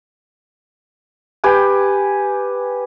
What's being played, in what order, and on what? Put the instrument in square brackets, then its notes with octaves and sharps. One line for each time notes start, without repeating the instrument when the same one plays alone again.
[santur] G4 B4 G5 G#5